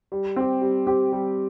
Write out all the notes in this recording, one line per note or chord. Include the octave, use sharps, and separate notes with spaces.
G3
C4 G4
G3
C4 G4
G3